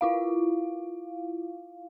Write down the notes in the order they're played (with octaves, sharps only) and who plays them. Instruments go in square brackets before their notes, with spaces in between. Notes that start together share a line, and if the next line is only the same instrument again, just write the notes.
[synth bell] E4 F4 F5